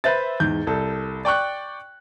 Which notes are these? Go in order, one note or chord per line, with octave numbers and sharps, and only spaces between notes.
B4 C5 E5 A6
E2 G#2 G6
C2 A4
D5 G5 C#6 F#6